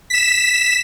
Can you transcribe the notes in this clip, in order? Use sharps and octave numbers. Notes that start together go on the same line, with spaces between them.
B6 E7